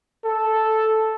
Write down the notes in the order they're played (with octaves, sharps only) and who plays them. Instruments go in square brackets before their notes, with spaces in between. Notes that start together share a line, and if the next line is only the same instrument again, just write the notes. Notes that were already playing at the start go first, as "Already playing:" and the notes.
[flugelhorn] A4